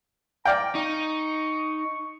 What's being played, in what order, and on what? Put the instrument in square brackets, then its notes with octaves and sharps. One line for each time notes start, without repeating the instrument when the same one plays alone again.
[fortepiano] D5 F5 G5 [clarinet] A#5
[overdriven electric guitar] D#4 [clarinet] C#6